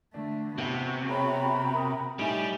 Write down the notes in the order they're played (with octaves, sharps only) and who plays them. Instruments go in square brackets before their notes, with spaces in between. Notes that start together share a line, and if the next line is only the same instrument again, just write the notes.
[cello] D3 A3 [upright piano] D4
[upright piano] A1 E2 A5 [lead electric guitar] C3 [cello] B3 F#4
[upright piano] G#4 C#5 [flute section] G5 A#5 B5
[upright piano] A#4 D#6
[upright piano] A2 D#4 [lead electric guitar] G3 [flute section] E5 G#5